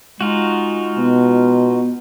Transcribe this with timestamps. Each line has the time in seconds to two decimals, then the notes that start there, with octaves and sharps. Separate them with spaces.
0.21 G#3 D#4 F4 F#4
0.98 B2 B3